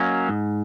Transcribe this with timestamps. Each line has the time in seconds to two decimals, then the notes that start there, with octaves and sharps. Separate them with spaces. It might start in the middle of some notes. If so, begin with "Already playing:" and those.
Already playing: F#3 A#3 C#4 D#5
0.29 G#2